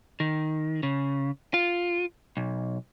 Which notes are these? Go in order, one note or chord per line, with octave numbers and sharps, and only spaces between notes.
D#3
C#3
F4
B1